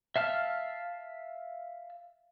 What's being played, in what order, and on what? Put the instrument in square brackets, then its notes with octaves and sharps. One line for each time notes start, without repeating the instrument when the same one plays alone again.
[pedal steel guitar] E5 F5 A5 F6